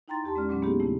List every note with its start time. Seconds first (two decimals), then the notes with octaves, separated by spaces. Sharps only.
0.08 D#4 E4 G5 A#5 C6 A6
0.24 E2 G4 A5 C6
0.35 G#3 C#4 D5 F6
0.49 A#2 F#3 G#3 C4 C#4
0.62 A#3 B3 D#4 E4 G4 G#4
0.80 E2 C#3 A3 E4